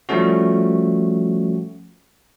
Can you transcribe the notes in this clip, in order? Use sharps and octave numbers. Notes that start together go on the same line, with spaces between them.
F3 G3 A3 C#4 F#4